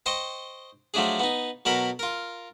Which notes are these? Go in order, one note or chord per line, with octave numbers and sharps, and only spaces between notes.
C5 D#5 G5 C#6
F3 F#3 A3 D4 G#4
B3 D#4
B2 F#3 A4 A#4 B5
F4 A#4